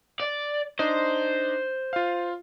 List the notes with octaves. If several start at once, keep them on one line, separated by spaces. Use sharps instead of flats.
D5
D4 D#4 C5 D#5
F4 F5